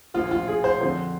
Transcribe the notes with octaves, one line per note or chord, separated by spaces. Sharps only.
A#1 A#2 F3 F4
F4
G#4
C5
F2 D3 F3 C5